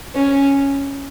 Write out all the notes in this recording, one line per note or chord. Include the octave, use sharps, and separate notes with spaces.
C#4